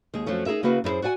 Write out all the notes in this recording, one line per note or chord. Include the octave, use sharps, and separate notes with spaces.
D#2 G#3 G#4
F2 F3 F#3 A3 C#4
D#4 G#4 A#4 E5
C#3 A#3 E4 F#4 B4
F#2 D#4 E4 G#4 C5
F#4 D5 F#5 G#5